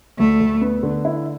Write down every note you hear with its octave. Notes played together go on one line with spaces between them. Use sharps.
D2 A3
D2
B3
D3
E4